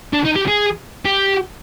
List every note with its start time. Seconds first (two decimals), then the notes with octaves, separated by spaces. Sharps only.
0.13 D4
0.25 D#4
0.36 G4
0.48 G#4
1.05 G4